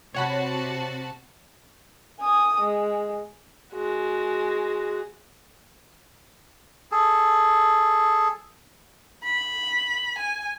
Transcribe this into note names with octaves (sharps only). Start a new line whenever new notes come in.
C3 F#4 C#5 F#5 A5 B5
G#5 D#6
G#3
G#3 F#4
G#4 A4
B5
G#5